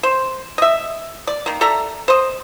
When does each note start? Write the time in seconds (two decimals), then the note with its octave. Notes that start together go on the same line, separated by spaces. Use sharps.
0.03 C5
0.58 D#5 E5
1.27 D5
1.46 D#3 A#3
1.61 A4 D5 E5 A#5
2.08 C5 D#5